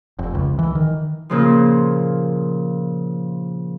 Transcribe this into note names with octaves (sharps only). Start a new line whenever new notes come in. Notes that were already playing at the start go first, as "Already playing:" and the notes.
F1
C#2
E3
D#3
A#2 C#3 F3